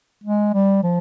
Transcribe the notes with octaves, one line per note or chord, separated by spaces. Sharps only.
G#3
G3
F3